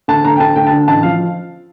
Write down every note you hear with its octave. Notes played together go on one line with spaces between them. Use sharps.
D2 A5
D2 A#5
G5
D2 A5
D2 G5
A5
D3
A1 A5
F3 F5